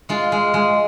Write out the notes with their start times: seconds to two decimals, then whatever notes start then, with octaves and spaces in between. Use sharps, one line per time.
0.09 G#3 F4
0.32 G#3
0.54 G#3